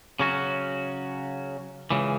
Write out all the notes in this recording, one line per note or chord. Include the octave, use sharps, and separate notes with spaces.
C#3 F#3 C#4 F#4
C#2 C#3 E3